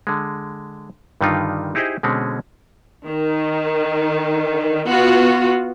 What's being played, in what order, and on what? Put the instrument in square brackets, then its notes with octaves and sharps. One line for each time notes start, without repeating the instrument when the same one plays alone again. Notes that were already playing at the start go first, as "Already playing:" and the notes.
[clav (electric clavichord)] D3 G#3
G2 D3 D#3 G3 D#4 F4
D#4 E4 G4 G#4 C5 D#5
B2 D3 G#3 C4 C#4
[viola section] D#3
B3 F4 F#4